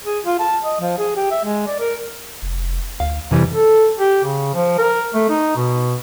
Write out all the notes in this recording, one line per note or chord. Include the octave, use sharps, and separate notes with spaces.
G#4
F4
A5
D#5
F3
G#4
G4
E5
G#3
D5
A#4
F1
D2 F5
F2 C3 E3 G3
A4
G4
C#3
F3
A#4
A3
D#4
B2